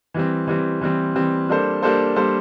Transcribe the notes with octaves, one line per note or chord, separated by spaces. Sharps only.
E3 G3 C4
E3 G3 C4
E3 G3 C4
E3 G3 C4
G3 A#3 D4 A4 C5
G3 A#3 D4 A4 C5
G3 A#3 D4 A4 C5